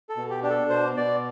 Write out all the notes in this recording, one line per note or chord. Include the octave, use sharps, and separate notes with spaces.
A4
B2
G4
D4 G4
A4
B2 C5
B2 D5